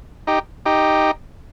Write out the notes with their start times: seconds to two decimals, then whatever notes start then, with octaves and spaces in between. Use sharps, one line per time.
0.27 D#4 G4
0.66 D#4 G4